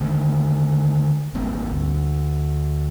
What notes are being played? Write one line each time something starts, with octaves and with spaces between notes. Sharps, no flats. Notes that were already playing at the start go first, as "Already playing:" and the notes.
D3 D#3 A3
G#1 G3 A#3 C4
D2